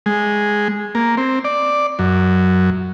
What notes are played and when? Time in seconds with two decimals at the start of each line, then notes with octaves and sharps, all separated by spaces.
0.06 G#3
0.95 A#3
1.17 C4
1.45 D5
1.99 F#2